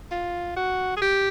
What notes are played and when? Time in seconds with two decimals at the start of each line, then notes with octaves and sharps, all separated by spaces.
0.11 F4
0.56 F#4
0.96 G#4
1.01 G4